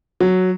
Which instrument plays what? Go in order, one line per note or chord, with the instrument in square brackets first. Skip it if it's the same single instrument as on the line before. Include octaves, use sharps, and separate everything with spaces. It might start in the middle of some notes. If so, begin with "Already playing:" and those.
[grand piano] F#3